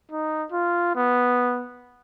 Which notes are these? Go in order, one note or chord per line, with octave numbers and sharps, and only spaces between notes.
D#4
F4
B3